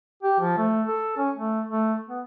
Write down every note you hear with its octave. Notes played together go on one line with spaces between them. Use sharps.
G4
F3
A3
A4
C#4
A3
A3
B3